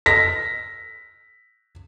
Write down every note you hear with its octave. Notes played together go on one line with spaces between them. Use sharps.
A#6 B6